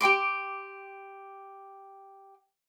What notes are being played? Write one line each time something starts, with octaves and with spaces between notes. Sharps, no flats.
G4 G5 C6 D6